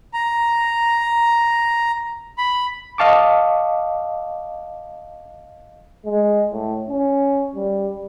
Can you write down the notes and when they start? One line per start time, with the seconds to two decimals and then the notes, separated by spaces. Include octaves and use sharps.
0.14 A#5
2.38 B5
2.98 D#5 F5 A5 C#6 D6
6.06 G#3
6.52 A2
6.89 C#4
7.55 G3